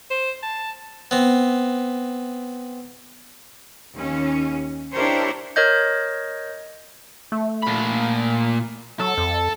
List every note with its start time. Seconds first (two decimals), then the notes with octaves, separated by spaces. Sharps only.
0.11 C5
0.43 A5
1.11 B3 C4
3.94 D#2 C#4
4.92 D4 E4 G4 A#4 C5 C#5
5.56 A#4 C#5 D#5 G6
7.32 A3
7.63 A#2 B5
8.99 F#3 A4
9.17 F2